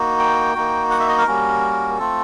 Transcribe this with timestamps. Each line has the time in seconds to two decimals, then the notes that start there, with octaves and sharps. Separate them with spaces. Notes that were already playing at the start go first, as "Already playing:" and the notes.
Already playing: A#3 D#4 F#4
0.19 G5
0.55 A#3 D#4 F#4
0.90 F#5
1.00 E5
1.08 D#5
1.18 A#4
1.26 G3 A#3 C#4 F#4
1.98 A3 C4 F4 A4